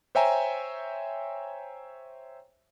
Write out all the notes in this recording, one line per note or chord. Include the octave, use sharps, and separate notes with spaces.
C5 C#5 E5 G5 G#5 A#5